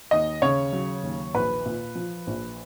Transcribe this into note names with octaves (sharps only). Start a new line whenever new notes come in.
D#2 D#5
C#3 C#5
F#3
D#2
A#1 B4
A#2
F3
A#1